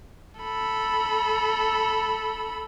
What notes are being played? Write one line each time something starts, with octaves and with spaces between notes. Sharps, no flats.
A4 B5